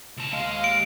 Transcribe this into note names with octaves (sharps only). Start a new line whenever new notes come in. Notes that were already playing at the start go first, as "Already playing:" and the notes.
C#2 A5
D#2 G#3 D#5 F5
D7